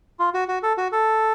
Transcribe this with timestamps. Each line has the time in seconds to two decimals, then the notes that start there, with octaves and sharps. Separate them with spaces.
0.19 F4
0.34 F#4
0.48 F#4
0.63 A4
0.78 F#4
0.92 A4